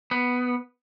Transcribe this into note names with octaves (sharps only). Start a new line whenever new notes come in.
B3